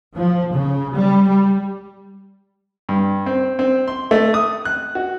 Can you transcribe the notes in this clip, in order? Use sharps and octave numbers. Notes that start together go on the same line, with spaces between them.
F3
C#3
G3
G3
G2
C4
C4
C6
A3
D#6
F#6
F#4